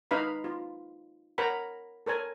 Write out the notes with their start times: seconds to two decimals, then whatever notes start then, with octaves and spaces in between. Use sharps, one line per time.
0.11 D#4 B4 F5 A#5 B5
0.44 F4
1.38 A#4 C#5 F#5 A#5 B5
2.06 A4 A#4 C#5 G#5